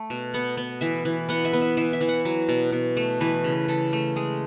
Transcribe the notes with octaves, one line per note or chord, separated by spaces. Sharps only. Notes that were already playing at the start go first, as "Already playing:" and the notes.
Already playing: A3
B2
B3 F#5
B3
E3 E5
E3
B3 F#5
E5
B3
E5
E3 E5
E5
E3
F#5
F#3
B2
B2
A3
E3 B4
C#3
C#3 A4
A3
G#3 G#4